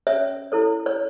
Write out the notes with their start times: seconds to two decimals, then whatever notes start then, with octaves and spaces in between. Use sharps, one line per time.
0.07 C#4 C#5 E5
0.52 E4 A4 C#5
0.86 C#5